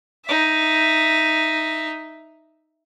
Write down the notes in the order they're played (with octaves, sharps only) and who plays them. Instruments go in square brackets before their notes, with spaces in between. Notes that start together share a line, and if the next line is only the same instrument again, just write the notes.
[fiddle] D#4 E5